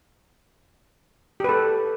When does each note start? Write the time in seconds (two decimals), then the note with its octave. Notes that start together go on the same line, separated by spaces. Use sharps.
1.40 G4
1.44 B4
1.49 A4